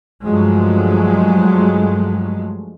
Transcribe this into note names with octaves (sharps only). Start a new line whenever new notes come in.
G2 F3 F#3 G#3 A3